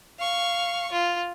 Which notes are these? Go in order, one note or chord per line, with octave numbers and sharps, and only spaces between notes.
F5 C#6
F4